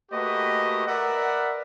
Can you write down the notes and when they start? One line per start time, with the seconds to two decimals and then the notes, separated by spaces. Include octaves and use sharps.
0.11 A3 A#3 F#4 G4 B4 D#5
0.87 A#4 B4 D5 E5 F#5